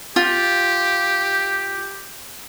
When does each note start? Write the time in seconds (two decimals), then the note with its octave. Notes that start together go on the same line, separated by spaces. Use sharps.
0.16 F4 G4